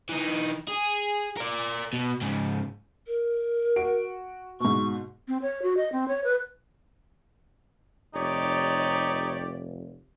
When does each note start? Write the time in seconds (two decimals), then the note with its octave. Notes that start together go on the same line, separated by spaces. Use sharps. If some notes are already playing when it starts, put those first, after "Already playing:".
0.09 E3 D#4
0.68 G#4
1.37 A#4 D5
1.93 B2
2.22 G#2 C#3
3.07 A#4
3.76 F#4 D7
4.60 G#2 B2 C#6
5.28 C4
5.42 C#5
5.62 F#4
5.77 D#5
5.92 C4
6.08 C#5
6.24 B4
8.14 F1 D#4 G4 C#5 D5